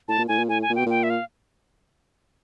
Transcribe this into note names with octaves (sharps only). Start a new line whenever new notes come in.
A2 A5
A#2
A2 G#5
A#2
A2 G#5
G#5
A#2
B2 G5
A#2 G5
E5
F5